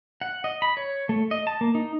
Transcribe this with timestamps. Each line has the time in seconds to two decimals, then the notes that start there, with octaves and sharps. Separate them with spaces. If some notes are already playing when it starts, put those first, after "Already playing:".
0.21 F#5
0.44 D#5
0.62 B5
0.77 C#5
1.09 A3
1.31 D#5
1.47 A5
1.61 A#3
1.75 D#4